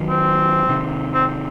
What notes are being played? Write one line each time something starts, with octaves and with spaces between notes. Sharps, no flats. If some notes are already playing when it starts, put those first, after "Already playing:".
Already playing: D#3 F#3
C4
C3 D#3
C4